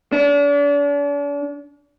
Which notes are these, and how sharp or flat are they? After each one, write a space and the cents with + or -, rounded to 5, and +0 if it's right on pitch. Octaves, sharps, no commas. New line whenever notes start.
D4 -40